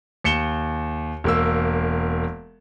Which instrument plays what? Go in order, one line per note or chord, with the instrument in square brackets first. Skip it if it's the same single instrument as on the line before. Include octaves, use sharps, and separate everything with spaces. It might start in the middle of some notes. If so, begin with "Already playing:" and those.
[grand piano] D#2 C#7 E7 G7
E1 A#3 E6